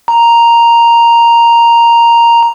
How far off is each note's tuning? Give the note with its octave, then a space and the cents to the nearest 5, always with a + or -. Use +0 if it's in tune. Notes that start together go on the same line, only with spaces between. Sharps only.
A#5 +0